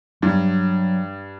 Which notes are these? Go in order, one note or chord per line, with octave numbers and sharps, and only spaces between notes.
G2 F#3